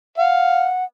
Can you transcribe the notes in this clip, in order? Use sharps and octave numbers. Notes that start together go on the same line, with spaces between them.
F5 F#5